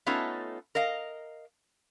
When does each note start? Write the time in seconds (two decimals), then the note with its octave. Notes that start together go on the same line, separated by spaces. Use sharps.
0.06 A3 B3 C#4 D#4 F4 A4
0.75 A#4 D#5 F5